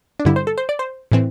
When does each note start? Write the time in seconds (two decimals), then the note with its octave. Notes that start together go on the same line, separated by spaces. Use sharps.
0.20 D4
0.25 G2 D3 G3 E4
0.36 C5
0.47 A4
0.58 C5
0.69 D5
0.79 C5
1.12 A2 E3 C4